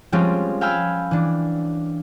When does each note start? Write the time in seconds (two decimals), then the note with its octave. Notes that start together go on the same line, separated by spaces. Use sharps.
0.12 F3 G3 G#3 C4 C#4 F4
0.61 F5 G5 G#5 B5 E6 F6
1.11 E3 D4